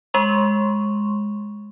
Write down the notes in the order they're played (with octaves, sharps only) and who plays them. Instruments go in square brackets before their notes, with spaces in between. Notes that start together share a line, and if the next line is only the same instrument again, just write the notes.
[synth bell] G#3 C6 C#6